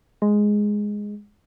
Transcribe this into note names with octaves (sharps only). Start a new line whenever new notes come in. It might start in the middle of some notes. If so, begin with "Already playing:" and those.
G#3